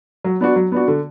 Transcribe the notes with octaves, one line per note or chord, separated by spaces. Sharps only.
F#3
B3 D4 F#4
F#3
B3 D4 F#4
D3